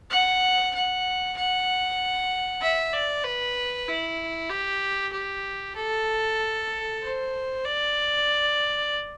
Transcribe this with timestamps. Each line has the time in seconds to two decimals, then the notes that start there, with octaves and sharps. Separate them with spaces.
0.10 F#5
0.74 F#5
1.36 F#5
2.62 E5
2.94 D5
3.24 B4
3.88 E4
4.50 G4
5.13 G4
5.76 A4
7.02 C5
7.65 D5